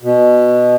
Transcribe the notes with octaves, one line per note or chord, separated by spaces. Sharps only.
B2